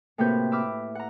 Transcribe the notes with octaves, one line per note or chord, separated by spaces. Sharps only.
A2 C3 A#3 F#4 B4 G6
E5 B5 D6 E6 F6
F#5 A#5